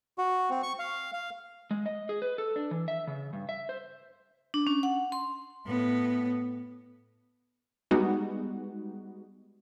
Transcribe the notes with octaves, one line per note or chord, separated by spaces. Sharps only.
F#4
C4
C#6
F5
F5
G#3
D#5
G#4
B4
A4
D4
E3
E5
C#3
G2
E5
C5
D4
C#4
F#5
C6
A2 B3
G3 G#3 B3 D#4 F#4